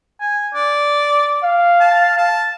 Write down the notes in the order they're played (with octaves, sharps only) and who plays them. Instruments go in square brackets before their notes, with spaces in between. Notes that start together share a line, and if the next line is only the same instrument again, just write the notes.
[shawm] G#5
D5
[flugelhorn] F5
[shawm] A5
A5